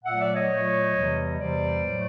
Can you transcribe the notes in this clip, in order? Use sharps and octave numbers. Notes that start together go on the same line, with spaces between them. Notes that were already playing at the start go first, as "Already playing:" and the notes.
A#2 F#3 A3 E5 F#5
D5 E5
C#5 D#5
A#2 F#3 A3
E2 C3 E3 G3
E2 C3 E3 G3 C5 D5
A2 F#3 A3